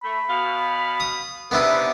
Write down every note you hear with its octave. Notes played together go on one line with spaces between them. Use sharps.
A3 B5
B2 F5
D#6
G#2 C3 B3 D4 E4 B4